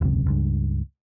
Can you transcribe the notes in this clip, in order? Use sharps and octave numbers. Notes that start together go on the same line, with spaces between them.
E1 C#2 F#2 C3
C#2 G2